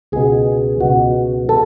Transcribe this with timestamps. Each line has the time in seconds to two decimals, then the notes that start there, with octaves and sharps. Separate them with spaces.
0.12 C#2 B2 G#4
0.80 C#2 B2 F#4
1.49 A4